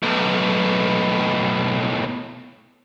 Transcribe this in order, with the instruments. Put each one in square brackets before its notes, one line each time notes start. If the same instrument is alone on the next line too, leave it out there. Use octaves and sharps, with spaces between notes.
[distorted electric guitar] B1 A2